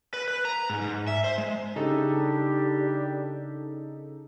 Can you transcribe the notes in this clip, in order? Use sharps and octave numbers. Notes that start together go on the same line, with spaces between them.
B4
B4
A#5
G#2
G#2
E5
C5
G#3
C#3 G3 D4 D#4 G4 A4